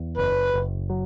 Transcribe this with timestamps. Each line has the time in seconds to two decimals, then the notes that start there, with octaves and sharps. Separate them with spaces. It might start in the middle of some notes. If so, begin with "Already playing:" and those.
Already playing: E2
0.17 F#1 B4
0.54 F#1
0.90 F#3